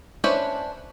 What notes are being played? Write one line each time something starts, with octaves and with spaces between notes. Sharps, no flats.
C#4 D4 E4 B4 C5